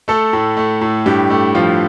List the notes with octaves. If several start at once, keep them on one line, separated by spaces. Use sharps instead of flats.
A3 A4
A2
A3
A2
G2 G4
A3
F3 F4